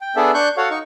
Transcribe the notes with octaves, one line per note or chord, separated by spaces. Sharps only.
G5
B3 D4 G#4 A4 D5 E5
D4 C#6 F#6 G6
F#4 A4 C#5 F5 F#5
D#4 C#6